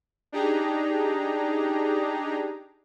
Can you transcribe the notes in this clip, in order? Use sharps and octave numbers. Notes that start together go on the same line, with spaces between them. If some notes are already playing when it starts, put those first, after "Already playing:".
D4 D#4 G4 G#4 A#5